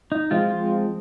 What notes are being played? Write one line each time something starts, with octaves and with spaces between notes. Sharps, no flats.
D#4
F3 G#3 C4 F4
F4